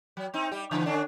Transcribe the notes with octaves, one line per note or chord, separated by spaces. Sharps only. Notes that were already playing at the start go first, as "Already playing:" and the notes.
F#3
C4 D#4
G3 G4
C#3 E3
D3 C#4 D4